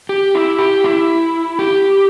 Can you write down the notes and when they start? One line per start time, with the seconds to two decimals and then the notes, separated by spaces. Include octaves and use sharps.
0.09 G4
0.35 E4
0.58 G4
0.84 E4
1.59 G4